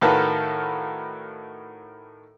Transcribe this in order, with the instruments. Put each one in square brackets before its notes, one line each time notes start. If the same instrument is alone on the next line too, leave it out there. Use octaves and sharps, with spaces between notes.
[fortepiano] A2 D#3 F#4 A4 B4 F5